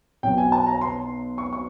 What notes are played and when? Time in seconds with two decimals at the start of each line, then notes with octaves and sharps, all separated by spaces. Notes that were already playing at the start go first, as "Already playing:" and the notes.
0.23 B1 B2 F#3 G5
0.38 G#5
0.52 A5
0.67 A#5
0.81 C6
1.38 C#6
1.53 C#6